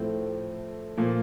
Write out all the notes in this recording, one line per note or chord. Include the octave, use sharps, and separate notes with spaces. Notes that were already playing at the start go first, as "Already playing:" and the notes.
Already playing: A2 F3 A3 C4
A#2 F3 A#3